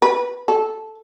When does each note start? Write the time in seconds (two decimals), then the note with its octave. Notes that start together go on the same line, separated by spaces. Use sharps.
0.02 B4
0.48 A4